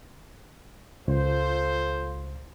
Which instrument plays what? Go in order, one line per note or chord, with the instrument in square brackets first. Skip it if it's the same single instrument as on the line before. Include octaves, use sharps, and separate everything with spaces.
[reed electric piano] C#2 [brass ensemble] F4 A4 C5